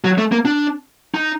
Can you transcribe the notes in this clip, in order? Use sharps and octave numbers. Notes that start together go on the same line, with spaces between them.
F#3
A3
A#3
D4
D#4